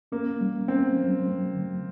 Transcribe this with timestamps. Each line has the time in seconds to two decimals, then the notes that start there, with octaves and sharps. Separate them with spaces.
0.12 A#3 C#4
0.41 G3
0.68 C4 C#4
0.97 F#3
1.26 A3
1.53 D3